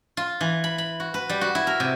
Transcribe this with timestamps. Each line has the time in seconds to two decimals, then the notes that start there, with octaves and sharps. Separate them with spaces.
0.17 F4
0.41 E3
0.64 B5
0.78 B5
1.00 F#4
1.14 B4
1.29 G3
1.41 F#4
1.55 E4
1.67 A#4
1.80 C3